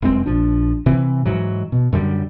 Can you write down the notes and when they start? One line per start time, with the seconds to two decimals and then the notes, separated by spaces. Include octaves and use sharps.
0.02 F1 F#2 G#3 C4
0.26 A#1 F3 D4
0.86 C3 E3 C4
1.25 G#2 E3 F#3
1.72 B2
1.93 F#2 D3 G3